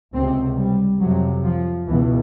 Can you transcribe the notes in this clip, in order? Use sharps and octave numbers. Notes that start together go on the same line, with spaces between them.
C#2 C3 C4
G3
F2 C3 F#3
F3
C#2 B2 E3